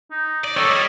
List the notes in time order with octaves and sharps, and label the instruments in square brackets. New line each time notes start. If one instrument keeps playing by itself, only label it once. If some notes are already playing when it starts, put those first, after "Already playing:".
[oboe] D#4
[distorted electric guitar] D5
[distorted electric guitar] D#3 G3 [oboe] A4 [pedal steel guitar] C#5
[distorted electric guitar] G3 [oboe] D#5